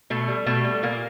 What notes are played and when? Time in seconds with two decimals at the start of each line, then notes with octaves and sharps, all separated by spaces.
0.10 B2 A3
0.28 G3
0.46 B2 A3
0.65 G3
0.83 A#2 A#3